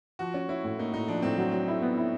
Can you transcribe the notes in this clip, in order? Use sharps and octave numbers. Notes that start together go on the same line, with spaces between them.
F3 F#4
C#4
C#4 E4
A2
A#3 D#4
A2 D#4
F3 D4
A2 C4
F#3
F#3
E4
B3
E4